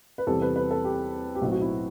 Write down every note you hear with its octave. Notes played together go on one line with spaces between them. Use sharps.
B4
E2 C3 G3 C4 A4
B4
B4
A4
G4
G4
B1 A2 F#3 C4 F#4
F#4
E4